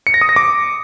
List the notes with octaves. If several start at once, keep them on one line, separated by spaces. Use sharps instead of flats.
C#7
A#6
D#6
A#6
D6